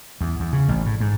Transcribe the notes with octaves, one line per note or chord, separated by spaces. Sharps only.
E2
E2
C#3
A1
A2
G#2